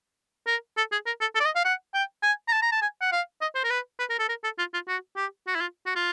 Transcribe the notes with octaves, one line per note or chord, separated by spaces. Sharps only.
A#4
A4
G#4
A#4
A4
A4
D5
D#5
F5
F#5
G5
G#5
A#5
A5
A#5
A5
G#5
F#5
F5
D#5
C5
A#4
B4
B4
A#4
A4
A#4
A4
F4
F4
F#4
G4
F#4
E4
F4
F#4
F4